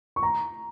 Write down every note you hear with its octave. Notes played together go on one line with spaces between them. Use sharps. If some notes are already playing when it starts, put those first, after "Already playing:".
C#6
A#5